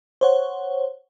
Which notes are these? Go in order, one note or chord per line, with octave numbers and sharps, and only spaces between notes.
C5 C#5 F#5